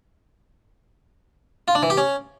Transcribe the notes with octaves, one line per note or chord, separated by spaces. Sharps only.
F4
D4
E3
G4
C#4